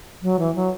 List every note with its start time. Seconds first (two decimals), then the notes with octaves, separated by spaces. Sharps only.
0.22 F#3
0.39 E3
0.55 F#3